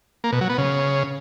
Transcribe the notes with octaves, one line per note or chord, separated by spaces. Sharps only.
A#3
B2
F#3
B3
C#3